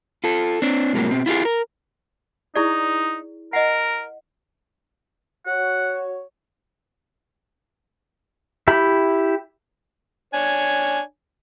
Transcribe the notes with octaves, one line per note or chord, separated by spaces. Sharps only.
F4 A4
C4 D4
A2 C3 F#3 G#3 A#3
B2 C4
E4 F4 G4 G#4
A#4
D#4 E4 G#4 D5
A#4 D#5 F#5
F#4 C#5 F#5
E4 G4 E5 B5
D4 C#5 G#5